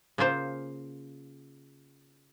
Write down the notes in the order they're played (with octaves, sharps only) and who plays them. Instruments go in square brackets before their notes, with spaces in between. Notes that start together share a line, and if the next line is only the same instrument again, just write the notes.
[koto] C#3 A#3 F4 C5